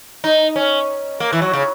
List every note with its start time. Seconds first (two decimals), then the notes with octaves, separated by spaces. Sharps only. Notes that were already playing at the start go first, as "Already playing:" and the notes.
0.24 D#4
0.56 C#4
1.20 A#3
1.33 E3
1.42 F#3
1.53 C#3